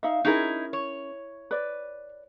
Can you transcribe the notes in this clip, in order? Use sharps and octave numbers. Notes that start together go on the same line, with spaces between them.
D#4 E5 F5
C#4 D#4 E4 G#4 A#4
C#5
B4 D5